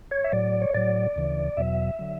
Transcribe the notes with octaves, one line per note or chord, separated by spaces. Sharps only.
C#5
E5
A2 F#3 D5
C#5
A2 F#3 D5
D2 C#3 E3
E2 B2 F#3 E5
D3 F#3